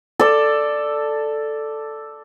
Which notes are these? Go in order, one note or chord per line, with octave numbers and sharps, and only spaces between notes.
A4 D5